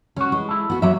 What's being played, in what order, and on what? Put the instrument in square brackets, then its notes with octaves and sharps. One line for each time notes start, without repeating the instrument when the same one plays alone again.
[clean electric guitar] C#2 F#4 [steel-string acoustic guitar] C#4
[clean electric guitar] E3 [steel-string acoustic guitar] G#3
[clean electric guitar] E4 A4
[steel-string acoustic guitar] B3 F#4
[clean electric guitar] F#2 A#3 [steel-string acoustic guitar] F#3 E5